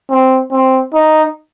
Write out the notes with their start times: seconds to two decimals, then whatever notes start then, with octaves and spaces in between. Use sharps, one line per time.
0.10 C4
0.52 C4
0.94 D#4